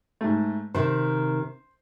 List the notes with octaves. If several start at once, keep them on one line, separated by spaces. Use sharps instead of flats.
G#2 A3
C3 D#3 C5